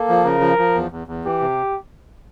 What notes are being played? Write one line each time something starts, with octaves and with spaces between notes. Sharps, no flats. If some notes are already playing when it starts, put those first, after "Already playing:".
Already playing: A#3 A4
F3
C#3 A#4
F3
F3
E2
E2
E2
E3 G4
C3